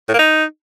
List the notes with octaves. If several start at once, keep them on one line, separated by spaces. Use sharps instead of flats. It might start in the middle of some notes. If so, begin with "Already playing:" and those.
A2
A#3
D#4